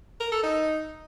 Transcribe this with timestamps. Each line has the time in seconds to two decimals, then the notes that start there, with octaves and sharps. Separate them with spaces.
0.20 A#4
0.32 A4
0.43 D#4